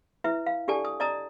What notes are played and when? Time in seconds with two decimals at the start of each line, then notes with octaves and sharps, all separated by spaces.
0.24 E4 B4 E5
0.46 F5
0.68 D4 G4 A4 D5 G#5 A5
0.85 D#6
1.00 D5 D#5 A5 A#5 D#6